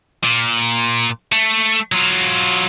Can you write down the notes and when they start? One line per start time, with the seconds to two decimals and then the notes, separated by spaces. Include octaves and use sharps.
0.24 A#2
1.32 A3
1.92 F#3 F4